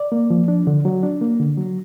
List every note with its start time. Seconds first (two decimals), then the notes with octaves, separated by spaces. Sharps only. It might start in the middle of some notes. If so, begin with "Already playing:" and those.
Already playing: D5
0.12 A#3
0.30 F3
0.48 D4
0.67 D3
0.85 F#3
1.03 D4
1.22 A#3
1.40 D3
1.57 F#3